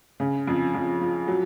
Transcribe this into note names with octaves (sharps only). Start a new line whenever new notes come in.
C#3
F2
F2
F3
F#3